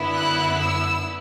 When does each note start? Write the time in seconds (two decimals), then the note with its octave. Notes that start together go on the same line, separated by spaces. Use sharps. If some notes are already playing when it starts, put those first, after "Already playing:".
Already playing: F#2 D3 B3 E4
0.12 F#6
0.57 E6